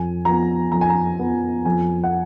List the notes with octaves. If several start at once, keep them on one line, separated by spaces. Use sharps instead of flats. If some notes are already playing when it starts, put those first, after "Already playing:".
Already playing: F2 G#5
F3 B3 A#5
F2 A#5
G#5
A#5
F3 B3
F2 G#5
F#5